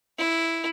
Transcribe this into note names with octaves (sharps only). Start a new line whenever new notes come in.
E4